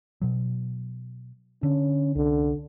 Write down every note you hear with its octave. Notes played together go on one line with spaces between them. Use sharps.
B2 F#3
D3 C#4
C2 D3